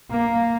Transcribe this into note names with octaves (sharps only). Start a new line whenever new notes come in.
A#3